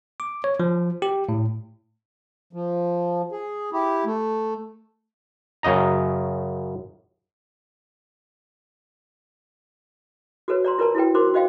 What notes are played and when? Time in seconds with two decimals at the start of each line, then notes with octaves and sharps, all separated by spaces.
0.20 D6
0.44 C#5
0.60 F3
1.02 G4
1.29 A2
2.53 F3
3.32 G#4
3.73 E4 G4
4.05 A3
5.63 F#2 C#3 D#5 A#5
10.48 F#4 A4 B4 C#5
10.65 D5 A#5 C6
10.78 F4 A#4 B4 D5 A5 A#5
10.95 E4 F#4 A4 B4 G5
11.14 D#4 F#4 A#4 C5 C6 D6
11.34 F#4 C5 D#5 F5 G5